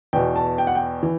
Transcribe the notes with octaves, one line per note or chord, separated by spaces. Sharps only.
E2 B2 G5
A5
G5
F#5
G5
E3